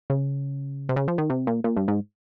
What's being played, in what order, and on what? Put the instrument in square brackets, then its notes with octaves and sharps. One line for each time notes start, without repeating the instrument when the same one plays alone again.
[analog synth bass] C#3
C3
C#3
F3
D#3
C3
A#2
A#2
G2
G#2